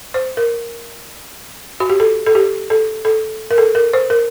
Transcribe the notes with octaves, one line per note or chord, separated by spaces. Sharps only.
C5
A#4
F#4
G4
A4
A4
G4
A4
A4
A#4
A4
A#4
C5
A#4